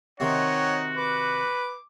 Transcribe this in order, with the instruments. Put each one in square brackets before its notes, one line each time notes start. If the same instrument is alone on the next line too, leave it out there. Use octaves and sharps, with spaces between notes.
[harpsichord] C3 D#3 [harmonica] D#4 F#5 G5 [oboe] F#4 [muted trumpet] C#5
[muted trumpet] B4 [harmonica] D6